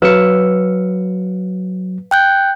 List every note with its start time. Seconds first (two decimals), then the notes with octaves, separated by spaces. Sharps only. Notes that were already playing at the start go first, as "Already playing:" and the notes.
0.02 F#3 B4 F5 E6 C#7
2.11 G5 F#6 G6